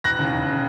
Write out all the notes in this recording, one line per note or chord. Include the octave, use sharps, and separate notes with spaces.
E1 F#6 A#6
D#2 C#3
E1
C#3